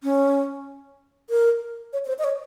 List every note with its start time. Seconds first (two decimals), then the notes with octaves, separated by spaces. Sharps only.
0.03 C#4
1.30 A#4
1.93 C#5
2.05 C#5
2.08 C5
2.19 D#5
2.24 C#5